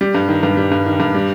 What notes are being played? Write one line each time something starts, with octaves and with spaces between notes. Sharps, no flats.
G3
G2
D#3
G2
G3
G2
D#3
G2
G3